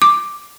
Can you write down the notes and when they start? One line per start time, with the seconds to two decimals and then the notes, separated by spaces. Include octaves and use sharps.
0.02 D6